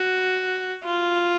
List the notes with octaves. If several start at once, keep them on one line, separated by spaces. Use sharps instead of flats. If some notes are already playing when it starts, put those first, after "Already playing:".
Already playing: F#4
F4